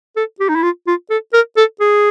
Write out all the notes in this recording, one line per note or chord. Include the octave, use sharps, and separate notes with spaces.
A4
G4
D#4
E4
F4
F4
A4
A#4
A4
G#4